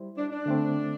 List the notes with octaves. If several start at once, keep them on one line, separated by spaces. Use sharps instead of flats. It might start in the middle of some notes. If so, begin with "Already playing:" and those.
Already playing: G3 E4 C5
D4
D4
D3 A3 C4